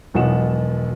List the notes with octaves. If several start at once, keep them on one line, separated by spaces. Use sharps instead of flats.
E1 B1 B2 F3 F#5 E7